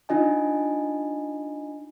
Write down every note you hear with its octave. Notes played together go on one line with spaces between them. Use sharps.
D4 D#4 F4 D#5 G#5